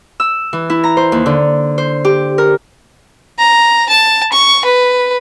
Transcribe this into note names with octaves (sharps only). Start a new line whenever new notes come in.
E6
E3
E4
A#5
C5
D#2
D3
C5
G4
A#4
A#5
A5
C#6
B4